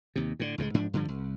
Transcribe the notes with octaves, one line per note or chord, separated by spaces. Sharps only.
D#2 C3
A2 D3
C#2 A2 E3 G#3
G#2 F3 D4
G2 D3 F3
C2